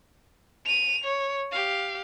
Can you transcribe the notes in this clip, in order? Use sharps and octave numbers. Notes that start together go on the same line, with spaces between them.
D#7 F7
C#5
G4 F5